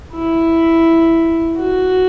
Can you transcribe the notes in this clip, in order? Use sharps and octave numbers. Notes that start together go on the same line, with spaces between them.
E4
F#4